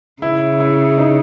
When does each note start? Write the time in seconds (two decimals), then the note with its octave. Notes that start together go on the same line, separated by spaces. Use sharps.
0.22 C#3 E4
0.60 E4
0.98 D#4